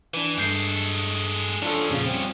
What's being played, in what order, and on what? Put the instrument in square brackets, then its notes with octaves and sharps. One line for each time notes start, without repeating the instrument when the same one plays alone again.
[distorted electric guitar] E3 [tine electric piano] D4 B4
[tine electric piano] G2 G6 C7 [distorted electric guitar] G#3 A4
[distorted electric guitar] F3 C#4 [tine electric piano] D4 F4 A4
[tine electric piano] F2 A#2 C#3
G3 C4